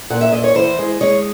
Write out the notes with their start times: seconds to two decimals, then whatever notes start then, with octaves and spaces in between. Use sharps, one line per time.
0.10 A#2 F#5
0.21 E5
0.32 A#2 D#5
0.44 C#5
0.55 E2 C5
0.79 G#3
1.01 G#3 C#5